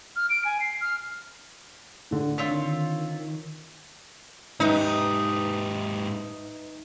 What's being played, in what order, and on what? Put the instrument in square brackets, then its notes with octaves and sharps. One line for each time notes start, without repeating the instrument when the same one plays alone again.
[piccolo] F6
D7
G#5
C7
F6
[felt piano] A2 D3
[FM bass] D3 [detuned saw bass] D#3 [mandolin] C4 F4 C#5 [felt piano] B6
[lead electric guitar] G#2 G4 [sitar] D#4 [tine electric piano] B4 D#5 E5